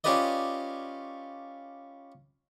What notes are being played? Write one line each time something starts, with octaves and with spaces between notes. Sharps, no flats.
C#4 F4 G4 B4 D5 D#5